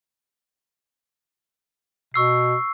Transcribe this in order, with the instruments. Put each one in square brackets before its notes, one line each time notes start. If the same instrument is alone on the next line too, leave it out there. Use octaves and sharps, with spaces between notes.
[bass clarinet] B2 [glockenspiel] C#6 E6 C7